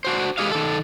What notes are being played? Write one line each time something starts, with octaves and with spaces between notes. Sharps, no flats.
D4 F#4 C5
G#3 G4 G#4 D#5 F5
D#3 A4